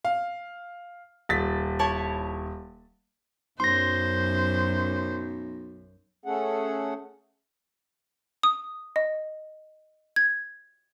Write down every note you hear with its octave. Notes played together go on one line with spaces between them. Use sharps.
F5
D#1 A6 B6
E4 C#5 A5
B1 F#2 C5 C6 A#6
A3 C#4 G#4 A4 F#5
D#6
D#5
G#6